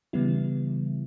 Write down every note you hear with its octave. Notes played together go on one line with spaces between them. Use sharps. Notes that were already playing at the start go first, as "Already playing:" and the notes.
C#3 E3 G3 B3 E4